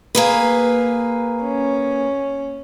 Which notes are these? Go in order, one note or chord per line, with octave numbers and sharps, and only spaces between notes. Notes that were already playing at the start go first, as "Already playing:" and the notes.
A#3 G#4 B4
C#4